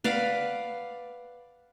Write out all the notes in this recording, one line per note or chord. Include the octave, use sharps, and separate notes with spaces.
B4 D5 F5 F#5